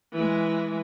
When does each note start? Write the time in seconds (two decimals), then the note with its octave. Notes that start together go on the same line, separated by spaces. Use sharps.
0.13 E3 G#3